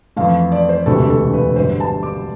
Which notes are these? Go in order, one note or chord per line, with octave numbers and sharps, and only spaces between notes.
F2 E3 A3 F5
D5
C5
E1 D2 C3 E3 A3 A4
A4
B4
G1 G2 D3 G3 B3 C5
A5
D6